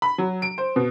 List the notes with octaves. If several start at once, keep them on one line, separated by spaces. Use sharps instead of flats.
B5
F#3
D7
C5
B2